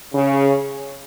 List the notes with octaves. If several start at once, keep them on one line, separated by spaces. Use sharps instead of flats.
C#3